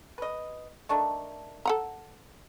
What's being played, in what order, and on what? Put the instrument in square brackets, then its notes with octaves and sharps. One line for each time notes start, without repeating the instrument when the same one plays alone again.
[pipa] B4 D#5
D#3 A3 D4
[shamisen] A4 F#5 A#5